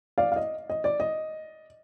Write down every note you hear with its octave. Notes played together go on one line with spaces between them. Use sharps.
D5 F5
F5
D#5
D#5
D5
D#5